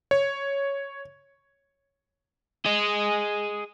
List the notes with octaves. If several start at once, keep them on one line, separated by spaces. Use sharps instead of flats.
C#5
G#4 D#5